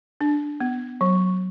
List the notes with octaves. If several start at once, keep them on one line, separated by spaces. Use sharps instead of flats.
D4
B3
F#3